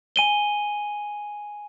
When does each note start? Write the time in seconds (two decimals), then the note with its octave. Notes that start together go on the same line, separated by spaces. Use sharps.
0.16 G#5 D#7 G7